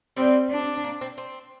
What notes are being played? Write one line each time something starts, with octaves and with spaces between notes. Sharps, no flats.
G3 C4
D4
A#3
C4
C4